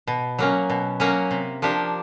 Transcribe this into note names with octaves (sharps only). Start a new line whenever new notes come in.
B2
F#3 A#3 C#4
B2
F#3 A#3 C#4
C3
F3 A#3 D4 G4